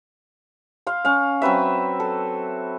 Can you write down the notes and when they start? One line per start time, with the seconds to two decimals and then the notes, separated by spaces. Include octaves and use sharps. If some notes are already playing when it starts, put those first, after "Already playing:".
0.87 F5 C6
1.05 C#4 F5
1.42 F#3 C4 B4 E5
2.00 A4